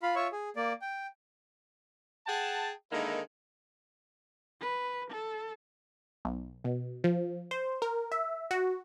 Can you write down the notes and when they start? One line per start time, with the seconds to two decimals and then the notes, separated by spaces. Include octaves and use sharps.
0.03 F4 F5 B5
0.16 F4 C#5 E5 C#6
0.32 G#4
0.56 A#3 D5
0.82 G5
2.26 G#4 F#5 G5 A5
2.91 D3 D#3 G#3 A#3 D#4 E4
4.61 B4
5.10 A4
6.25 B1
6.64 B2
7.04 F3
7.51 C5
7.82 A#4
8.12 E5
8.51 F#4